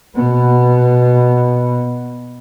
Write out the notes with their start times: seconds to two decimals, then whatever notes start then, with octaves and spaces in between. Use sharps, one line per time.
0.15 B2 B3